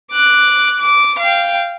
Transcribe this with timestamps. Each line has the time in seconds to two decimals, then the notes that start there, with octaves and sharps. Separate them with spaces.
0.11 D6 F#6
0.79 D6
1.19 F5 G5